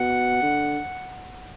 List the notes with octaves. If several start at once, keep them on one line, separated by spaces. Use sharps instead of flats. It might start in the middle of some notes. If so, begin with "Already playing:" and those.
Already playing: B2 F#5
D3